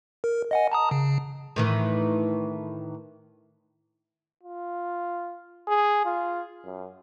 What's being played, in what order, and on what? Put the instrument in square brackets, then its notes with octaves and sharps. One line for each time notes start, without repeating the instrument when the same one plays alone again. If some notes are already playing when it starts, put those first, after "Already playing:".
[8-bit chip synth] A#4
D#5 F#5 G#5
A5 A#5 D#6
C#3
[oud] A2 D#3 E3
[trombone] F4
G#4
F4
F#2